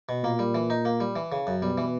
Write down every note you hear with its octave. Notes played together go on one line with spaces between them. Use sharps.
B2
A#2 A#3
G3
E3
D#4
A#3
G3
E3
C#3
F#2
B2 G3
E3